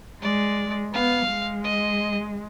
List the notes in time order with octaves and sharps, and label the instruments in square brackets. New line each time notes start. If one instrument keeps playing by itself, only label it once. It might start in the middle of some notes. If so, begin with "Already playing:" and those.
[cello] G#3 [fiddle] D5
[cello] B3 [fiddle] F5
[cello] G#3
[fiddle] D#5